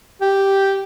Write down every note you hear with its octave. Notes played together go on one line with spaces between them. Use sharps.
G4